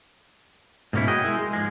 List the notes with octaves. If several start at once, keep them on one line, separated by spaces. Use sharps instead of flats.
G#2 B2 A#3 C#4 E4
F#4 G#4 A#4 D#5 G5
G#3 E4
G#3
G#2 F3 G#3